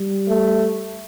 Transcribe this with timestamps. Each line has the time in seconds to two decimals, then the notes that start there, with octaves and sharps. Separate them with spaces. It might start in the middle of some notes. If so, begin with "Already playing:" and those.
Already playing: G3
0.28 A3